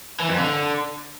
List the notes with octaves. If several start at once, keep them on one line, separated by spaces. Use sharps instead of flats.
E3
F2
D3